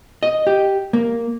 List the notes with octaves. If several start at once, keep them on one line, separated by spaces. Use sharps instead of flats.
D#5
G4
A#3